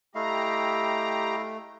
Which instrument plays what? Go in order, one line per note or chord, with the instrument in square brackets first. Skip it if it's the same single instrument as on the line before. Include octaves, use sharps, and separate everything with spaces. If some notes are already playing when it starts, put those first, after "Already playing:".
[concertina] A3 [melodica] E4 D#5 F5 [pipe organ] G4 A#5